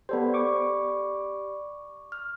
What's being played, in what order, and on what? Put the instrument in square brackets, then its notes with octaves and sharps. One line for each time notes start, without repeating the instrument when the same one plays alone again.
[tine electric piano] B3 A4 C5 [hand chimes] G4 D5 B5
[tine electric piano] C#6 D6
[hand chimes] F6